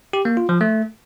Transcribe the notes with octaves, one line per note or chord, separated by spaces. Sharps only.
G4
A#3
F4
F3
A3